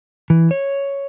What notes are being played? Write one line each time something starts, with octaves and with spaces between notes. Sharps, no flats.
E3
C#5